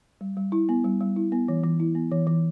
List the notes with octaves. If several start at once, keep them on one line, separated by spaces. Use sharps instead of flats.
G3
G3
E4
B3
G3
G3
E4
B3
E3
E3
E4
B3
E3
E3